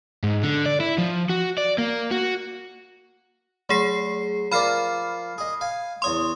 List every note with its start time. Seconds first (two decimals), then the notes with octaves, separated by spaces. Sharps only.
0.23 G#2
0.43 D3
0.66 D5
0.80 E4
0.98 F3
1.30 F#4
1.58 D5
1.78 A#3
2.11 F#4
3.69 F#3 A3 G#4 C7
4.52 F3 A#4 D5 B5 F6 C7
5.38 G#4 D#5
5.61 F5 G#5
6.02 E2 C#5 C6 C#6 D#6